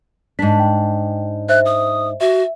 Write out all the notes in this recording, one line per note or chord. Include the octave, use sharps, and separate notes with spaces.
G#2 D4 B6
G5
C5 E5 F#6
D#6
F#4 E5